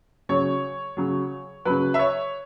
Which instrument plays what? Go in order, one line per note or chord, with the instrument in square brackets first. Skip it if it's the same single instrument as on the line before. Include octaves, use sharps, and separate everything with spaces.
[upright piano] C#3 F#3 C#5
C#3 F#3
C#3 F#3 B4
E5
C#5